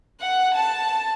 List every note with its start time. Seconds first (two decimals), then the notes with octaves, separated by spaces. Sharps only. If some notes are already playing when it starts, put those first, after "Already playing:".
0.21 F#5
0.57 A5